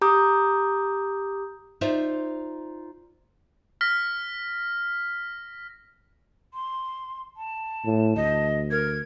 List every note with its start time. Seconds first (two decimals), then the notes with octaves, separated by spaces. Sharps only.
0.01 G4 A#5 D6 D#6 G6
1.81 D#4 F4 C5 D5 E5
3.81 F6 A#6 B6
6.54 C6
7.37 A5
7.85 A2
8.16 D2 D#5
8.71 A#4 G#6